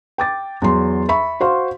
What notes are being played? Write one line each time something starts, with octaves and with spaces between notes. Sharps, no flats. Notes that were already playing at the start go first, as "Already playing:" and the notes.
G5 D6 A6
E2 F#3 C6
E5 B5 C#6
F#4 C5 F5 C6